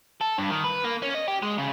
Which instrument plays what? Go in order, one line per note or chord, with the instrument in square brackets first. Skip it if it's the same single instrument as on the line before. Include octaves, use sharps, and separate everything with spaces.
[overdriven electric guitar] A4
G2
D#3
B4
A#3
C#4
D#5
G4
G#3
C#3